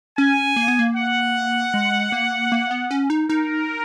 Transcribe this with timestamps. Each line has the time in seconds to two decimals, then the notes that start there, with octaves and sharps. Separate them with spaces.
0.18 C#4 G#5
0.56 A#3
0.68 B3
0.79 A#3
0.96 F#5
1.74 G#3
2.12 A#3
2.52 A#3
2.71 B3
2.91 C#4
3.10 D#4
3.30 D#4 A#4